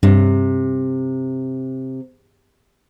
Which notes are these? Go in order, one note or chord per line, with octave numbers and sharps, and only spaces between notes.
G2 C3